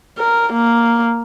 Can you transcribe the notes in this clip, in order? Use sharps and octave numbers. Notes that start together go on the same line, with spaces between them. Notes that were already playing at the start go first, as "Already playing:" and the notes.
A#4
A#3